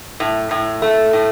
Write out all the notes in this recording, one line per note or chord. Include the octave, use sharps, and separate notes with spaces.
A2
A2
A3
A2